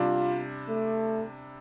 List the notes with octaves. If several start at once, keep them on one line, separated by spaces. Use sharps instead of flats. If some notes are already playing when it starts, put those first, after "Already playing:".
Already playing: C3 G3 D4 F4
A3